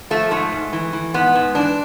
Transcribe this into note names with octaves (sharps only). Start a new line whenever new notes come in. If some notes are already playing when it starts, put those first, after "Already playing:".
F3 A3
G#2 A3
G#2
E3
E3
G#2 B3
G#2
E3 D4